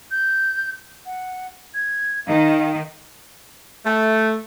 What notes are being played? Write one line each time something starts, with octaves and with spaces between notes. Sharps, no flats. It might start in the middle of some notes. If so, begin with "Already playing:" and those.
G6
F#5
G#6
D#3 F5
A3